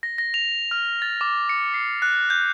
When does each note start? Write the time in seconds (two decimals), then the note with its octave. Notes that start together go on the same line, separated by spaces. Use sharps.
0.03 A#6
0.18 A#6
0.34 F7
0.71 F6
1.02 A6
1.21 D6
1.49 C#7
1.74 C7
2.02 F#6
2.30 G6